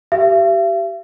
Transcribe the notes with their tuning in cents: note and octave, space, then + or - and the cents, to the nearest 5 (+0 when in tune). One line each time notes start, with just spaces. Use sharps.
G4 -20 E5 +45